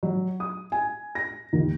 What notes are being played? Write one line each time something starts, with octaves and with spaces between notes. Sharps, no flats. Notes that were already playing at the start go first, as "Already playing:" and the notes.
F#3
D#6
G#5
A#6
D#2